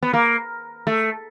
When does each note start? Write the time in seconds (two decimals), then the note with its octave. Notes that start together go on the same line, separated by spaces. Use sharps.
0.02 B3
0.13 A#3
0.87 A3